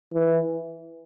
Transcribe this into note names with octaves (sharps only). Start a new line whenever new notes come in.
E3